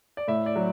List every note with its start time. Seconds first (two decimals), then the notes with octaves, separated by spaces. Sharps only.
0.17 D5
0.28 A2 E5
0.46 D5
0.56 F#3